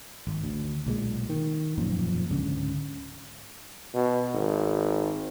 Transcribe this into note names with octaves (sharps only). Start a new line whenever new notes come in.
G#1
D2
B1 A#2 G#3
D#3
E1 F#2 A#2 F3
C#2 G#2 D3 C#4
B2
G#1